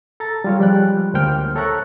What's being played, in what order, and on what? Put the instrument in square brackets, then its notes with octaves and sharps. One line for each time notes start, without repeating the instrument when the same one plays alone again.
[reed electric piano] A4 A#5 A6
G3 F4 C#5
F3 G3 G#3 G5 F#6
D2 A#3 C5 G5 F6
A4 C#5 E5 A#5 C#6 F#6